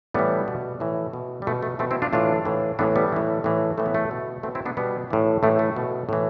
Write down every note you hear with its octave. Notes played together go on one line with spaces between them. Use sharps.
A2 E3 G3 B3
B2
A2 E3
B2
G3
B2 A3
A3
B2 A3 C4
C4 E4
D4 F4
A2 E3 D4 F4
A2 E3
A2 E3 B3 D4
G3 B3
A2 E3
A2 E3
A2 E3 A3
B3
A3
B2
B2 A3 C4
C4 E4
B3 D4
B2 G3 B3
A2 E3
A2 E3 A3
A3
B2
A2 E3